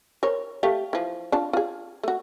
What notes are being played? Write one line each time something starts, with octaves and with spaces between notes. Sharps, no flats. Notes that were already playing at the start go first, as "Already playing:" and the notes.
A#4 C5 C#5
A3 G4 F5
E3 F3
D4 F4 A5
F4 G#4
A3 F#4